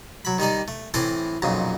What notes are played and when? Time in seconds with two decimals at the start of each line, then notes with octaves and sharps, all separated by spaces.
0.25 F#3 B5
0.38 D#3 G3 D#4 D5
0.68 A3
0.94 A2 E3 C4 A4 C5 D6
1.42 B1 F2 A#2 C#3